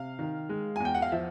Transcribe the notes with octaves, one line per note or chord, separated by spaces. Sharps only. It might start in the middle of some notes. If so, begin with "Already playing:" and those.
Already playing: C3 F5
D#3
G#3
G#5
E2
G5
F#5
F5
F3 E5